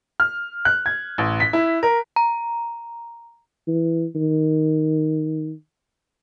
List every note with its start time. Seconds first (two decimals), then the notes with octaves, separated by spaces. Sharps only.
0.20 F6
0.65 F#6
0.86 G#6
1.18 A1
1.40 B6
1.53 E4
1.83 A#4
2.16 A#5
3.68 E3
4.15 D#3